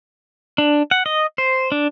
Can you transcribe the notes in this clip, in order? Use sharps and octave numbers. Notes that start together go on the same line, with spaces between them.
D4
F#5
D#5
C5
D4